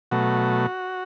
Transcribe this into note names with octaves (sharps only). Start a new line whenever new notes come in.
B2 F#3 A3 F#4